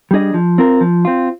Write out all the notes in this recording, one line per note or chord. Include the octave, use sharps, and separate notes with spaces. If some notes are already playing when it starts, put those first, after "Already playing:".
G3 D4 G#4 D#5
F3
C4 F4 A#4
F3
C4 F4